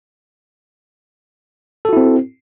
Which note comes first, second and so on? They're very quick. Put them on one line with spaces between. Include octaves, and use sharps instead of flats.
A4 F#4 E4 C4